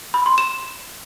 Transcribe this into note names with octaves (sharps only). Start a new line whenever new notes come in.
B5
C6
E7